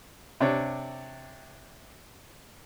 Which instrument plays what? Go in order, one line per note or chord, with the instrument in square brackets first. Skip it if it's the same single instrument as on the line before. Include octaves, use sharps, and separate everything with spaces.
[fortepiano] C3 D4 C#5